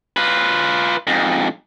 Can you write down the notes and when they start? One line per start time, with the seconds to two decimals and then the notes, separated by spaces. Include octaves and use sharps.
0.17 F4 B4
1.07 F2 G#2